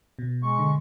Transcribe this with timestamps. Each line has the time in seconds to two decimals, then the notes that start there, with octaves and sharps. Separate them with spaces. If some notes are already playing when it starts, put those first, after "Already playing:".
0.19 B2
0.43 G#3 C#6
0.59 D3